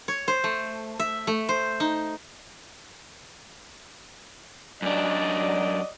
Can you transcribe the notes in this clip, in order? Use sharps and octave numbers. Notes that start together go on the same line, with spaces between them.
C#5
C5
A3
E5
A3
C5
D#4
F#2 F#3 D4 D5 D#5